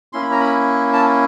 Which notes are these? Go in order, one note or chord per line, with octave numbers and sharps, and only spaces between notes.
A#3 C#4 E4 C6
B5
A#5
B5
A5